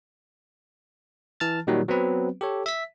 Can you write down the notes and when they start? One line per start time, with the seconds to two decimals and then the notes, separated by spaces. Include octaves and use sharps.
1.40 E3 A5 F6 A6
1.67 A#2 D#3 F#3 G3
1.88 F#3 B3 C4 B4
2.41 G4 A4 C#5
2.66 E5 B6